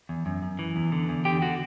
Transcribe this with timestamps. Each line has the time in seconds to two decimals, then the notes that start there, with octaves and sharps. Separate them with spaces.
0.09 E2
0.26 F#2
0.43 F#2
0.59 E3
0.76 E2
0.92 D3
1.09 E2
1.25 D3 G4
1.42 D3 F#4